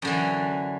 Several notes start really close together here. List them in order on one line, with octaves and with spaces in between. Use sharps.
F#2 D3 E3